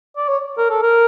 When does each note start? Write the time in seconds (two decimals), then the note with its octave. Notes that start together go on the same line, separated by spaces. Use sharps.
0.17 D5
0.28 C#5
0.58 A#4
0.70 A4
0.83 A#4